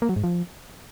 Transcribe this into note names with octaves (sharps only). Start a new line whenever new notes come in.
A#3
F#3
G#2
F3